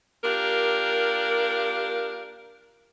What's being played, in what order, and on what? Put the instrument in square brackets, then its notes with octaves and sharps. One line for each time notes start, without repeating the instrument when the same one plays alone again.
[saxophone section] A#3 D4 F4 G4 A#4